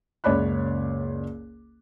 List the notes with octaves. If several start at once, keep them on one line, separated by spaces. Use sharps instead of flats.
F#1 C#2 C#5 D5 B5 F#6